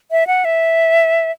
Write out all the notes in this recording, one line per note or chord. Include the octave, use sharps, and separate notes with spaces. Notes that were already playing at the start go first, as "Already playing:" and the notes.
E5
F#5
E5